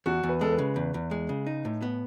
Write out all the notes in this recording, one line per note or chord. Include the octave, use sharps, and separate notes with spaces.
E2 F#4
E2
B4
G#3 A4
B4
C#3
E2
E2
G#3
C#3
D#4
A2
B3